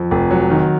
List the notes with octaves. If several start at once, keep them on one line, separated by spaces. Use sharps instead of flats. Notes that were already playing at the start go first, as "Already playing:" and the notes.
Already playing: F2
F1
F#3
D#3